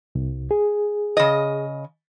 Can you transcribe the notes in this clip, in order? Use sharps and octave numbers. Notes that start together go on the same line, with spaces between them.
C2
G#4
C#3 D#5